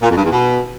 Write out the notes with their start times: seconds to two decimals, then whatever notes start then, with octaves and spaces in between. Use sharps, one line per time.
0.02 A#2
0.09 F2
0.17 G2
0.24 E2
0.31 B2